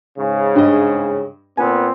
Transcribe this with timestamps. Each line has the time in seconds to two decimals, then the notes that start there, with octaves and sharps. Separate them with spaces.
0.18 G#2 C#3
0.55 G2 D#5
1.57 A#2 B3 C4 G#5